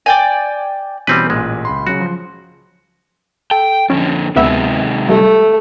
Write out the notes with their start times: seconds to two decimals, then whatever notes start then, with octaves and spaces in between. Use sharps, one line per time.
0.06 D5 G5 G#5
1.07 B2 E3 G3 C4 C#4 B4
1.30 A1 A#2 G#3
1.65 C#2 B5 C6
1.87 C#3 F#3 F#4
2.00 F3 C6
3.51 A4 G5
3.90 F2 D3 C#4
4.36 D2 C3 D#3 G#3 B3 E5
5.09 G3 A3